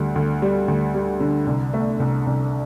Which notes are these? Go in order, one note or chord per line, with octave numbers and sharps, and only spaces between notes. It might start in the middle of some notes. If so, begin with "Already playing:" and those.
Already playing: D2 G3
D2
G3
D2
G3
D3
C2
A3
C2
C2